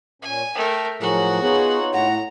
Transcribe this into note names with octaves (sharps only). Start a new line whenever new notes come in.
A#2 C#4 G#5
A3 A#4 G5
A2 F3 F#3 F#4 G#4 A#4 F#5
B3 D#4 F4 G#4 C#5
A2 F#5 A#5